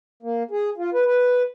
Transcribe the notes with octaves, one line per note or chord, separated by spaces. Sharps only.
A#3
G#4
F4
B4
B4